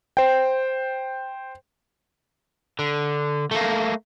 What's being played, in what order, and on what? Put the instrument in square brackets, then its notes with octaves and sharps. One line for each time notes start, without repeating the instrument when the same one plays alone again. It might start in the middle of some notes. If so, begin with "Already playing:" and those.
[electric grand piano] C5 G5
[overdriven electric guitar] D3
A3 A#3